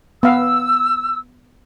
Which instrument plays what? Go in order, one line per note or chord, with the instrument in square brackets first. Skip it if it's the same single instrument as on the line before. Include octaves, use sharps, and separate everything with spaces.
[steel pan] B3 F5 [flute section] E6